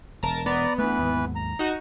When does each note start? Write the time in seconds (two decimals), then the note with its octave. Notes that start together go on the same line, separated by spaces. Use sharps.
0.23 E1 A#4 A5 A#5
0.46 B3 D5 A#5
0.78 E3 A3 D4 B4
0.99 D#2 G#2
1.36 A#5
1.59 D#4 F#4